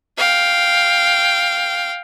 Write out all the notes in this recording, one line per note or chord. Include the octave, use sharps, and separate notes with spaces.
F5 G5